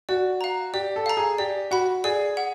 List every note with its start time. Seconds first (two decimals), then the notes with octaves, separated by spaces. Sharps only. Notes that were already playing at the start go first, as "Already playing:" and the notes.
0.09 F#4 D5
0.41 F5 A#5
0.74 G4 D5
0.96 A4
1.06 F5 A#5
1.17 G#4
1.38 G4 D5
1.71 F#4 F#5 B5
2.04 G#4 D5
2.37 F#5